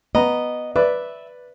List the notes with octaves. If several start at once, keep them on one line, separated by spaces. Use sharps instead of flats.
B3 D#5 A#5
B4 D5 E5